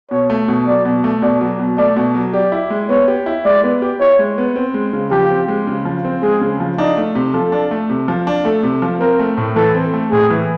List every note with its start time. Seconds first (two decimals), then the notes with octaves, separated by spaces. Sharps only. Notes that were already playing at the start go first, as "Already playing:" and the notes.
0.11 B2 C#5
0.30 A3
0.48 B2
0.67 F#3 D5
0.85 B2
1.04 A3
1.22 B2 D5
1.41 F#3
1.60 B2
1.78 A3 D5
1.97 B2
2.15 F#3
2.33 G4 D5
2.52 E4
2.70 G#3
2.89 B3 C#5
3.08 G4
3.26 E4
3.45 G#3 D5
3.64 B3
3.82 G4
4.00 E4 C#5
4.19 G#3
4.38 B3
4.56 C4
4.74 G#3
4.93 C#3
5.11 F3 G4
5.30 C4
5.48 G#3
5.67 C#3
5.85 F3
6.05 C4
6.22 G#3 G#4
6.41 C#3
6.60 F3
6.78 D4 D#4
6.97 A3
7.15 C3
7.34 F3 A4
7.52 D4
7.71 A3
7.90 C3
8.08 F3
8.27 D4
8.45 A3 A4
8.63 C3
8.82 F3
9.01 C4 A#4
9.19 A3
9.37 A2
9.56 E3 A4
9.75 C4
9.93 A3
10.11 A2 G#4
10.30 E3